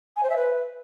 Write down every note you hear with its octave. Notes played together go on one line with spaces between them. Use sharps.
G#5
C5
E5
B4